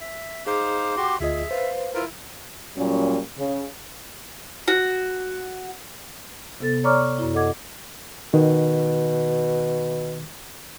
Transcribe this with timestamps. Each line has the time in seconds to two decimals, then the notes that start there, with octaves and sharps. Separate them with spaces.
0.01 E5
0.47 D#4 G#4 C5 F5 D6
0.97 F#4 G4 C6
1.20 D2 F4 G#4 D#5 E5
1.51 B4 C5 F5
1.94 E4 F4 A#4
2.78 A#2 F#3 G3 A#3 C#4
3.38 C#3
4.68 F#4
6.60 C3 B3 A4 A6
6.84 C#5 D5 A#5 C#6 D6 F6
7.18 F#2 E4
7.34 A4 D#5 F#5 D6 G#6
8.34 B2 D#3